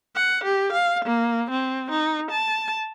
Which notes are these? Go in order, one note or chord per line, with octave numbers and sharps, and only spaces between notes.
F#5
G4
F5
A#3
C4
D#4
A5